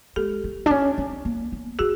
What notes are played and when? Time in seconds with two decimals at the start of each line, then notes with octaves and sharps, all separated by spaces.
0.16 G#3 G4 A4
0.44 A3
0.66 D4
0.71 C#4
0.98 C4
1.25 A#3
1.52 B3
1.79 C4 F#4 G#4